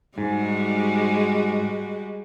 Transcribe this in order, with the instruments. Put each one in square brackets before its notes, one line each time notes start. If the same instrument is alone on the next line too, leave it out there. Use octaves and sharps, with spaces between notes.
[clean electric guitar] G#2 [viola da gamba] G3 G#3 F#4